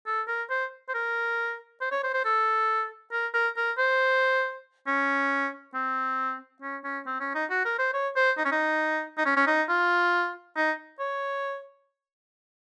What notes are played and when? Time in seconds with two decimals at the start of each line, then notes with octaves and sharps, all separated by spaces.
0.06 A4
0.28 A#4
0.50 C5
0.89 C5
0.94 A#4
1.81 C5
1.91 C#5
2.04 C5
2.14 C5
2.25 A4
3.12 A#4
3.34 A#4
3.57 A#4
3.78 C5
4.87 C#4
5.74 C4
6.62 C#4
6.84 C#4
7.06 C4
7.20 C#4
7.35 D#4
7.50 F#4
7.65 A#4
7.79 C5
7.94 C#5
8.16 C5
8.38 D#4
8.45 C#4
8.52 D#4
9.18 D#4
9.26 C#4
9.37 C#4
9.47 D#4
9.69 F4
10.56 D#4
10.99 C#5